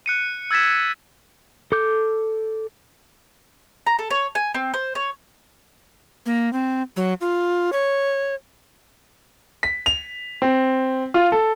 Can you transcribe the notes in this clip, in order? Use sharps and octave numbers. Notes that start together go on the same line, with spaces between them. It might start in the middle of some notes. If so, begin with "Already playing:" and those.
F#6 C#7 D#7
E6 G#6 A6 B6 E7
A4 D6 G6
A#5
A4
C#5
G#5
C4
C5
C#5
A#3
C4
F#3
F4
C#5
B6
F7
C4
F4
A4